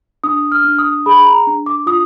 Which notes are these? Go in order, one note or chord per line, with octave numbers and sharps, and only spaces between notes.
D4 D#6
F6
D4
D#6
G#4 B5
A#5
D4
D6
F4 D#6